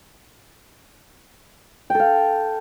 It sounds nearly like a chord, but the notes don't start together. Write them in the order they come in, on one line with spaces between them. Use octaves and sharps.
G5 A4 F5